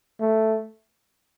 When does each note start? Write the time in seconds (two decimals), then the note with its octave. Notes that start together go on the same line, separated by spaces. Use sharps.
0.20 A3